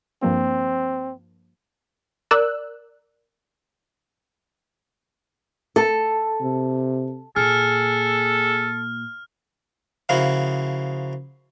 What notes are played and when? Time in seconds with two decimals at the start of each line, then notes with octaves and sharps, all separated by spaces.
0.23 G2 F3 A#3 C4
2.31 A#4 D5 E6 F#6
5.76 A4
6.41 C3
7.36 A#2 G#4 A4 F6
10.09 C#3 F3 A#3 E4 F#4